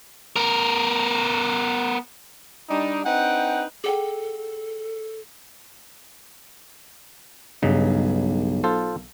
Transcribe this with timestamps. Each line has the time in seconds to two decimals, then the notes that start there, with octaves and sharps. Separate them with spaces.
0.36 B3 A#4
2.70 G3 D4 D#4
3.05 C4 D4 D#4 B4 F#5 G5
3.84 G#4 A4 F#5 G5
7.62 B1 G2 C#3 D#4
8.64 F4 A4 C5